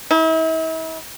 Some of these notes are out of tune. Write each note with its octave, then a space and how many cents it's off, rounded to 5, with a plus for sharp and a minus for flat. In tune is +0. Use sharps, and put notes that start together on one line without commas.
E4 -40